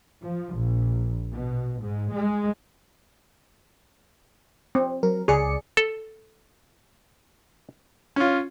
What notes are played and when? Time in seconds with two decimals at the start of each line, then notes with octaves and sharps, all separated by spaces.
0.23 F3
0.56 A#1
1.33 B2
1.81 G#2
2.13 G#3
4.75 C4
5.03 F#3 A#4
5.28 C#2 G#4 D5 C#7
5.77 A4
8.16 C#4 F4